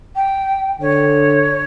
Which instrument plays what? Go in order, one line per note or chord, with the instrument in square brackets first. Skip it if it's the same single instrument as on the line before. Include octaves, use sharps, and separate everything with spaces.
[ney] G5
[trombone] D3 [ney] C#5